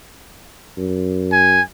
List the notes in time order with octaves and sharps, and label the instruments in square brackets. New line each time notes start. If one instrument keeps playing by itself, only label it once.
[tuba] F#2
[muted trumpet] G#5